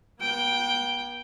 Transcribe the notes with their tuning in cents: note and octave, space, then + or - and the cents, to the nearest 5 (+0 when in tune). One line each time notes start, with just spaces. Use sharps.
B3 -40 G5 +0